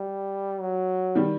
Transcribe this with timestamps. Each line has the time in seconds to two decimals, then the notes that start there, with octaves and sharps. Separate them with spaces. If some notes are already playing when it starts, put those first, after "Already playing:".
Already playing: G3
0.61 F#3
1.15 D#3 G3